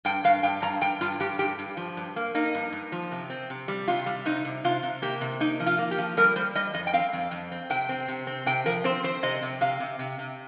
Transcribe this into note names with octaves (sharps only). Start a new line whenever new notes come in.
G2 G5
G2 F5
G2 G5
G2 A#5
G2 G5
G2 F4
G2 G4
G2 G4
G2
F3
G2
A#3
A#3 D#4
G2
G2
F3
C3
C4
C3
G3
C3 F4
G3
C3 D#4
C3
C3 F4
C3
A#3 G4
C3
A#3 D#4
F3
F4
A#3
G4
F3
G3 A#4
G3 C5
G3 D#5
F2 D#5
G5
C4 F5
F2
F2
C4
C3 G5
C4
C3
C4
C3 G5
F3 A#4
C4 C5
C4 C5
C3 D#5
C3
C3 F5
C3
C3
C3